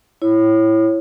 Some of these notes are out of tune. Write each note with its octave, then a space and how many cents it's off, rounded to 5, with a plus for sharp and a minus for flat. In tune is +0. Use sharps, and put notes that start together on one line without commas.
E4 +5 C#5 -15